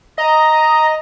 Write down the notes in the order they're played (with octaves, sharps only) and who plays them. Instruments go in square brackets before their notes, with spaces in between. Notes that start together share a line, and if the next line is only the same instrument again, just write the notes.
[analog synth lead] D#5 [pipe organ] A#5